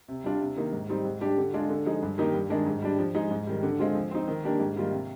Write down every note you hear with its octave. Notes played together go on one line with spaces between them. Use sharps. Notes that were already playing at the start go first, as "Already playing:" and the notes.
C3
G3 D4 F4
C3
D#3 A#3 D#4
G#2
G3 C4 D#4
G#2
G3 D4 G4
D3
G#3 D4 F4
D3
F3 G#3 D#4
G2
D#3 A#3 D#4 G4
G2
D#3 G#3 D4
G#2
G3 D4
F3
G#3 D#4
G#2
D#3 G3
D3
G#3 C4 F4
F3
C4 D#4
D#3
A#3 D4 G4
G#2
D#3 G3 A#3 F4
C3